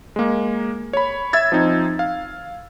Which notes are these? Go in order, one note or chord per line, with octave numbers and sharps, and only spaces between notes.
G#3 A#3
C#5 B5
E5 E6 G#6 A6
F3 C4 D#4
F5